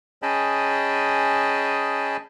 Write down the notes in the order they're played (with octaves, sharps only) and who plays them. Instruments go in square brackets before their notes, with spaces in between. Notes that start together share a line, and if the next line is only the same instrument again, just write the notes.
[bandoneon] C#4 G#4 D#5 G5 A5 B5